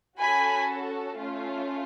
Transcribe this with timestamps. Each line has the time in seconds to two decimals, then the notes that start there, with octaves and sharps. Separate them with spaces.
0.19 C#4 F#4 A4 G#5 B5
1.17 A3 C#4 F4